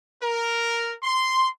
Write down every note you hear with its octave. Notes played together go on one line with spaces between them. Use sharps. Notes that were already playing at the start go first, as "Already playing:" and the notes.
A#4
C6